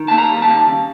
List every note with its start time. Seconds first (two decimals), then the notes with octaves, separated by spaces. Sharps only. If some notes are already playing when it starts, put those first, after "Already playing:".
Already playing: D#3
0.08 A#3 A5
0.18 A#5
0.31 G3
0.42 A5
0.48 D#3
0.68 C#3